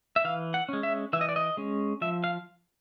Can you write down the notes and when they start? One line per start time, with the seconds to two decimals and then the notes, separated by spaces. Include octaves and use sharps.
0.16 E5
0.24 E3 F5
0.54 F#5
0.69 G#3 C#4
0.83 E5
1.13 E3 E5
1.21 D#5
1.29 D5
1.36 D#5
1.57 G#3 C#4
2.01 F3 E5
2.24 F5